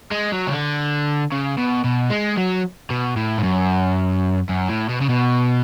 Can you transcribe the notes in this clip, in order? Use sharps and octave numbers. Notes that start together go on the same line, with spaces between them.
G#3
F#3
C#3
D3
C#3
B2
B2
G#3
F#3
B2
A2
G#2
F#2
F#2
A2
B2
C#3
B2